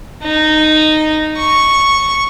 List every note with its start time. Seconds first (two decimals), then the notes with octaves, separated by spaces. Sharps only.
0.24 D#4
1.39 C#6